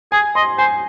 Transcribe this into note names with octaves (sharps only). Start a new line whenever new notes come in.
G#4 G#5
D#5 C6
C5 G#5